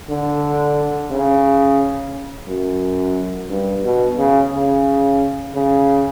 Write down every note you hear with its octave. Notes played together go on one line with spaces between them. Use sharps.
D3
C#3
F#2
G2
B2
C#3
C#3
C#3